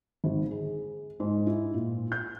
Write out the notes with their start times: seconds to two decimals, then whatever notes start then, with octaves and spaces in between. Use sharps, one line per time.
0.24 G#1
0.51 G#4
1.20 G#2
1.46 E4
1.74 A#2
2.12 G6